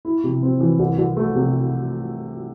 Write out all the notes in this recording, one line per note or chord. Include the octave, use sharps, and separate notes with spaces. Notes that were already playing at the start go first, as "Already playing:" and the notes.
E4
C3
C4
E3
C2
C2
A3
C3